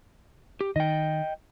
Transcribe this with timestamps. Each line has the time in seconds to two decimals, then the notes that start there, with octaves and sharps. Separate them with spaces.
0.61 G4
0.76 D#3 D#5 G5